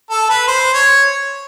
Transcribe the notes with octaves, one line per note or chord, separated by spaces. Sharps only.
A4
B4
C5
C#5